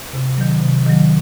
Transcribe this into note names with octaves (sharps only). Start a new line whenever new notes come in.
C3
D#3 F#3
C3
D#3 F#3